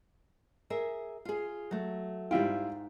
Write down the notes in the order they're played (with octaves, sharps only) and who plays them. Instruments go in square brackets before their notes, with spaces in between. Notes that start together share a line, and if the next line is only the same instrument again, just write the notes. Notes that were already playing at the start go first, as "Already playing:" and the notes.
[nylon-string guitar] G#4 A#4 E5
F4 G#4
F#3 A3
[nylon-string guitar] G#2 G5 [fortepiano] G3 E4 F4